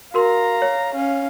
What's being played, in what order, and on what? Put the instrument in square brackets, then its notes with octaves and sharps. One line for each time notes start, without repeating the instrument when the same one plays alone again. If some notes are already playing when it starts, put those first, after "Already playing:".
[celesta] F#4 A#4 C6 [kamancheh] F5 A#5
[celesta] C#5
[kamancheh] C#4 F5